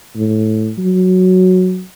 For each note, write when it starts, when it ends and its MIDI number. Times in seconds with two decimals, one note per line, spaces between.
0.16 0.72 45
0.78 1.83 54